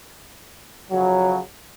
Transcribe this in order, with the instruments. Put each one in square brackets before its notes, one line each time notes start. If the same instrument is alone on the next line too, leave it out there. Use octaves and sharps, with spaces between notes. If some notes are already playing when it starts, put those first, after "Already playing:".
[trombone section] F2 C#3 F#3